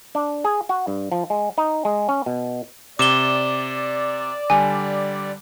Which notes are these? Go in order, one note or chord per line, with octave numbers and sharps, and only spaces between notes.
D4
G#4
F#4
G2
F3
G#3
D#4
G#3
C#4
B2
C3 D5 D6 E7 G7
D3 G3 G#5